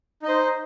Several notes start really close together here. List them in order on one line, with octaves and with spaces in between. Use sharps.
D#4 D#5 C5